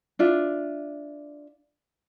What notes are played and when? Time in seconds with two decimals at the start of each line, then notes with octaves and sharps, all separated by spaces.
0.19 D4 F4 E5